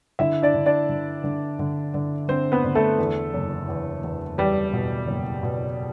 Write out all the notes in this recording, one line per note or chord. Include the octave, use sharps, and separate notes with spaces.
D3 E4 E5
D4 D5
D3
D4 D5
D3
D3
D3
D3
D3 C4 C5
B3 B4
D3
A3 A4
E2
F#1
E2
E2
E2 G3 G4
B2
F#1
B2